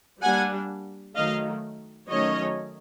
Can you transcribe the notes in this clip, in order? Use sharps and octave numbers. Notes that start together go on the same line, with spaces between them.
G3 A#3 D4 F#5 G#5
D#3 F#3 A3 D#5 F5
D#3 F#3 A3 C#4 C#5 D#5